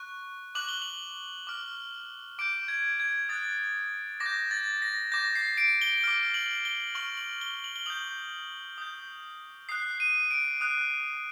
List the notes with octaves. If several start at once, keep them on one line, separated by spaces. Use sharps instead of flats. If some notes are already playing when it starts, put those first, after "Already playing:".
Already playing: C#6 F#6
D6 F#6 F#7
G7
F#7
D6 F6
D6 G6 D7
G#6
G#6
D#6 F#6 A6
D6 A#6
G6
A6
A#6
D6 G6 A#6
C7
D7
G7
D6 F6
F#7
G7
C#6 F6 F#7
F#7
G7
F#7
G7
D#6 G6 F#7
D#6 G6
D#6 F#6 C7
D#7
D7
D#6 F#6